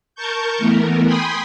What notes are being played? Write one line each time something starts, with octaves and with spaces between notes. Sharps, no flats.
A#4 A5 C#6 G6
E3 A3 B3 A#4
G5 G#5 B5 C6 D#6